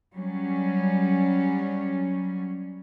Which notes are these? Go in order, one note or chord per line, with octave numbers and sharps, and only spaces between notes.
F#3 G3 C#4